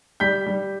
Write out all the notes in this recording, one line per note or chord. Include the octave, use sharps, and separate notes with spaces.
G3 G6 B6
G3